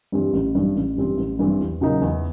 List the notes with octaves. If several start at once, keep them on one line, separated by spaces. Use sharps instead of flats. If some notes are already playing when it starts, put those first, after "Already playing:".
G2 E3 G3 C4
A1
G2 E3 G3 C4
A1
G2 E3 G3 C4
A1
G2 E3 G3 C4
E2
C#3 F#3 A#3 D#4
E2